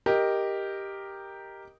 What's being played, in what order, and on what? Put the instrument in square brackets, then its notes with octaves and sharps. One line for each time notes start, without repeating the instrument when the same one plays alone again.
[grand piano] G4 A#4 D#5